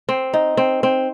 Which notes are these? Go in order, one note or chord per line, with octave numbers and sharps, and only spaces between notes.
C4
D#4
C4
C4